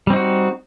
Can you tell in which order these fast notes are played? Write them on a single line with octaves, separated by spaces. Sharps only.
G3 C4 D#4 F#4